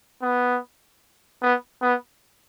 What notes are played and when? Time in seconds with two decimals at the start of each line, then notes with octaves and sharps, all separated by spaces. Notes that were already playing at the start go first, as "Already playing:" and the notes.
0.23 B3
1.42 B3
1.82 B3